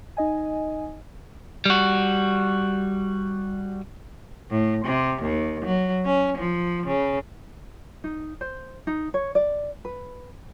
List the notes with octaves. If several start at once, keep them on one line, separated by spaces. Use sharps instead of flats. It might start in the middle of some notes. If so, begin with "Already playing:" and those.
D#4 D#5 G#5
G3 F#4
A2
C3
D#2
F#3
C#4
F3
C#3
D#4
C5
D#4
C#5
D5
B4